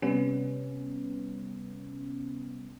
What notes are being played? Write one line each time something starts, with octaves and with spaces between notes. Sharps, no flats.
C3 G3 B3 C#4